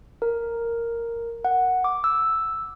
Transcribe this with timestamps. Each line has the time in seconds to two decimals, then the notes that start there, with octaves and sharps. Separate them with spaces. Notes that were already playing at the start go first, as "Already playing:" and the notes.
0.22 A#4
1.45 F#5
1.84 D6
2.04 E6